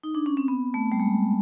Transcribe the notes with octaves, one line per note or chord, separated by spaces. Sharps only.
D#4
D4
C#4
C4
B3
A3
G3
G#3